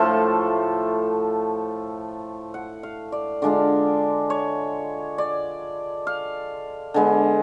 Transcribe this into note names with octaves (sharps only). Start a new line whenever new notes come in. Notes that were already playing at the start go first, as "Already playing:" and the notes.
Already playing: A2 F3 A3 F4 A5
F#5
F5
D5
D3 G#3 D4 F4 D5
C#5
D5
F5
D3 G#3 B3